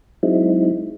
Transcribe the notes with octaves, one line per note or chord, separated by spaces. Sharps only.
F#3 G#3 C4 D#4 E4